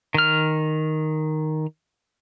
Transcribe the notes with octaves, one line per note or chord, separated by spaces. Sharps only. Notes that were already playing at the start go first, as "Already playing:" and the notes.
D#3 F6